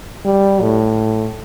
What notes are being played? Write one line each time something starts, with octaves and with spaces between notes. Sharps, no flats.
G3
A2